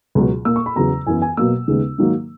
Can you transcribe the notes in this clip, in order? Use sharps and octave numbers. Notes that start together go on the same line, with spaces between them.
C#2 B2 F#3
A#2 A#3 E6
C#6
B5
E2 C#3 F#3 B3 A#5
F#2 E3 B3 G#5
G#5
B2 F#3 A#3 E6
D#2 C#3 G#3 B3
G#2 D#3 F#3 A#3